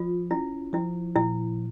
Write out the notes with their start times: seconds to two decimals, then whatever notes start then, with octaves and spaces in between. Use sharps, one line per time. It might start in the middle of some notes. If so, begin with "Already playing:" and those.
Already playing: F3 F4
0.31 C#4 E4
0.73 F3 E4
1.16 A#2 E4